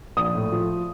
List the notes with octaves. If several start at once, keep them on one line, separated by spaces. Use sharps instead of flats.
A#1 D#6
A2
F3